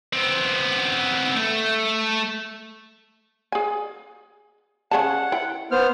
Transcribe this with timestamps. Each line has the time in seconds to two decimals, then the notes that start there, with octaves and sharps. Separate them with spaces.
0.13 B3 C4
1.36 A3
3.52 G#4 G#5
4.91 C#3 G#4 F#5 A5
5.32 E4 G5
5.71 B3 C5 F6